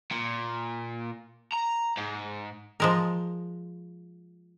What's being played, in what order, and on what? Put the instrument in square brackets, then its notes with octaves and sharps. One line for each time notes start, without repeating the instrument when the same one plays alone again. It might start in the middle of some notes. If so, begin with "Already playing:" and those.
[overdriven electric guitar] A#2
A#5
G#2
[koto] F3 G#3 A#4